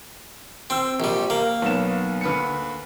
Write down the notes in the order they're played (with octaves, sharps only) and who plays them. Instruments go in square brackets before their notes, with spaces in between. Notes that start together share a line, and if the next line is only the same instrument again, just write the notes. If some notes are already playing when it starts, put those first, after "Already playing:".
[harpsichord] C4 [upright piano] G5 E6
[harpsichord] A#1 G3
A#3
[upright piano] B1 B3 E7
D2 B4 C#7